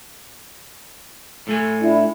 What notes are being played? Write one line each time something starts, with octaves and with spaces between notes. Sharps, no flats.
A2 A3 G#5
D4 E4